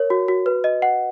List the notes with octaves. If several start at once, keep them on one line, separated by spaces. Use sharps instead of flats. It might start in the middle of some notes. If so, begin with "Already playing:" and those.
Already playing: A#4 C#5
F#4
F#4
B4
D#5
F#5